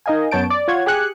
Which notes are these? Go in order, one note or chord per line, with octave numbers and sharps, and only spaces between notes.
D#4 A#4 D#5 F5 G#5
F#2 B3 C#5 A5 G6 D7
D5
F4 C#5 F#5 G#6
G4 G#4 G#5 F#6 C#7